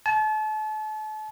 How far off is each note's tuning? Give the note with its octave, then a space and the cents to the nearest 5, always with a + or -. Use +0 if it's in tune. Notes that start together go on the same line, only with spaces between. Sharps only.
A5 -35